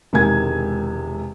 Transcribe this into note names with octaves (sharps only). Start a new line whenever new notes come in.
E1 C3 D#3 G#3 G#5 G#6